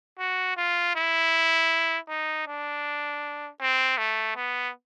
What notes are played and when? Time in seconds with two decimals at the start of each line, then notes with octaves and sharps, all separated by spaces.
0.19 F#4
0.57 F4
0.96 E4
2.09 D#4
2.47 D4
3.61 C4
3.98 A3
4.36 B3